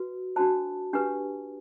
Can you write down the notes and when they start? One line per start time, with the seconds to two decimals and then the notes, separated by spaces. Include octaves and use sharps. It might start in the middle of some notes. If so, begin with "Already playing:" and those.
Already playing: F#4 B4
0.36 D4 F#4 C5 A5
0.93 D4 G4 B4